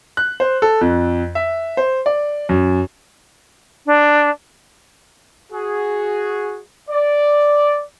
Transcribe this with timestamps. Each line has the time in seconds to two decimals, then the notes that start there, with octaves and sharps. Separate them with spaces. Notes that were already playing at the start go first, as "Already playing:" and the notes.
0.17 F#6
0.40 C5
0.62 A4
0.81 F2
1.35 E5
1.77 C5
2.06 D5
2.49 F#2
3.86 D4
5.53 F#4 G#4
6.90 D5